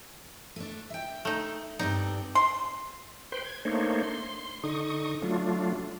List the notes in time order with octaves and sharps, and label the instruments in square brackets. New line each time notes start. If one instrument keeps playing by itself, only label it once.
[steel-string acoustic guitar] A3 D4
E5 G5
[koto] A3 D#4
[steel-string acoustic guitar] G2 C4 D5 [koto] D#4
[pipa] C6
[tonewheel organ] B4 C5 G5 C6
G#6
A3 A#3 D4 D#4 C5 C#5
C6
D3 D#4 C#6 D#6
F#3 A3 D4 F4